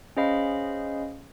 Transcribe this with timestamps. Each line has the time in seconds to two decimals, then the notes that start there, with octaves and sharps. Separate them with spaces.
0.17 C#4 G#4 C5 D#5 F5 B5